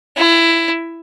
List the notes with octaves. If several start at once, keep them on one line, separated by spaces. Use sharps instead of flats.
E4